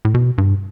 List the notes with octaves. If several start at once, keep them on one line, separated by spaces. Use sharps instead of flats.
A2
B2
G2